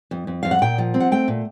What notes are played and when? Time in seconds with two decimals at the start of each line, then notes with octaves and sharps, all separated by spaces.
0.11 F2
0.27 F2
0.43 F2 F5
0.51 F#5
0.62 A#2 G5
0.78 F3
0.94 C4
1.00 F#5
1.12 A3 G5
1.28 A#2